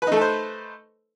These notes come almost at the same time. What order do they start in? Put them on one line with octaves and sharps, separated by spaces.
B4 D#4 A3 A4 C5